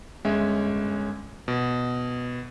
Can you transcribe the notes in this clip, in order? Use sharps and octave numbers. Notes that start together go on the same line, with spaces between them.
G1 G#3 C#4 E5 G#5
B2